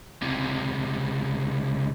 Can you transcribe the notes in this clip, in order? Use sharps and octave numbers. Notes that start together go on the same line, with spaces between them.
C#2 C3